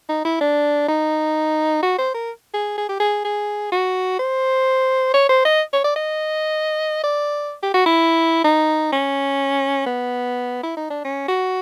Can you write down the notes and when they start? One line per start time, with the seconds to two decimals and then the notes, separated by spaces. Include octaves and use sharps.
0.09 D#4
0.25 E4
0.41 D4
0.89 D#4
1.83 F#4
1.99 C5
2.14 A#4
2.54 G#4
2.78 G#4
2.89 G4
3.00 G#4
3.25 G#4
3.72 F#4
4.19 C5
5.14 C#5
5.29 C5
5.45 D#5
5.73 C#5
5.84 D5
5.96 D#5
7.04 D5
7.63 G4
7.74 F#4
7.86 E4
8.44 D#4
8.92 C#4
9.86 B3
10.63 E4
10.77 D#4
10.90 D4
11.05 C#4
11.28 F#4